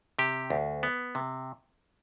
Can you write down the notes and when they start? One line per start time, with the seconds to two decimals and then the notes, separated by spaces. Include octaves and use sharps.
0.19 C3 G4
0.50 D2
0.83 B3
1.15 C3